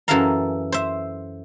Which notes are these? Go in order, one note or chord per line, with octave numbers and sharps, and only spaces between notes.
F#2 E3 A4 E5 F5 A#5
C5 E5